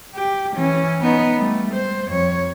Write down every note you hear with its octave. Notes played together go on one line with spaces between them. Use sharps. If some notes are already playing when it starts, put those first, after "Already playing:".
G4
E3 C#4
B3 D#4
G3 A3
C5
F2 C#5